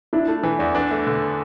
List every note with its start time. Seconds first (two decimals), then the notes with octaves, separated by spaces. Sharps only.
0.13 D4 E4
0.28 A3 A4
0.43 E3 B4
0.59 E2 D5
0.75 D4 B4
0.91 A3
1.07 D3